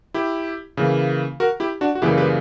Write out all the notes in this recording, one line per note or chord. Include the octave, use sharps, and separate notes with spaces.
E4 G4
C#3 E3 A#3
F#4 A#4
E4 G4
D4 F#4
F#4
F#2 C#3 E3 G3 A#3 E4 G4
G4 B4